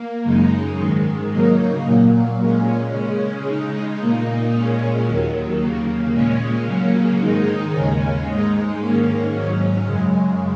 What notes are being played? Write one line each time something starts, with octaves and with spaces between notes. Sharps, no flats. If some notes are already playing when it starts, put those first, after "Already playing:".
Already playing: A#3
F#2 C#3 G#3 D#4
G#2 D#3 G#3
C#3 F#3 A#3 D#4
A#2 F#3 A#3
A#2 G#3 C#4
C#3 G#3 C#4
C#3 G#3 D#4
A#2 A#3 D#4
A#2 G#3 C#4
D#2 D#3 F#3
D#2 C#3 A#3
A#2 G#3 C#4
C#3 F#3 A#3 C#4
G#2 D#3 G#3 D#4
D#2 C#3 G#3 C#4
G#2 G#3 D#4
G#2 D#3 A#3 C#4
G#2 F#3 C#4
F#2 C#3 G#3